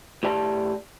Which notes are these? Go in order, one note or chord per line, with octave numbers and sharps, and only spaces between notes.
A2 G4 D5 A5